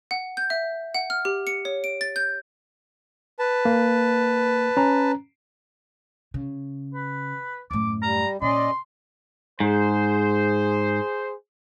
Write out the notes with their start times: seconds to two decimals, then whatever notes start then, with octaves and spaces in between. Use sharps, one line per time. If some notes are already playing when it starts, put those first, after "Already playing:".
0.11 F#5
0.37 G6
0.50 E5
0.95 F#5
1.10 F6
1.25 G4
1.47 C#7
1.65 C#5
1.84 D7
2.01 A6
2.16 G6
3.39 B4 A5
3.65 A#3
4.77 C#4 A#5
6.34 C#3
6.94 B4
7.71 F#2 A2 D6
8.03 G3 A#5
8.42 A#2 C#4 D5 D#5 C6
9.60 G#2 G#4 C5